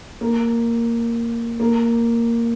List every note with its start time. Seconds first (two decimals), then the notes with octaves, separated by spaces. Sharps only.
0.21 A#3
1.60 A#3